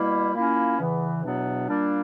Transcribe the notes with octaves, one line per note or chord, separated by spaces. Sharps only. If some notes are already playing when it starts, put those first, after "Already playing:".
Already playing: B2 G3 A#3 E4
A#2 A#3 C#4 E4
E2 C#3 E3 B3
E2 B2 F#3 B3 D4
A#2 G3 A#3 D4